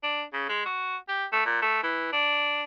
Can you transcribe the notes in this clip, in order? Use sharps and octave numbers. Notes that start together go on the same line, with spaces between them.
D4
C#3
G#3
F#4
G4
A3
A#2
A3
E3
D4